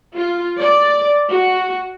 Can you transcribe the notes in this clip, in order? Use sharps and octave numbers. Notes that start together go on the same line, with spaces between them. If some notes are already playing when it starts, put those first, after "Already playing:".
F4
D5
F#4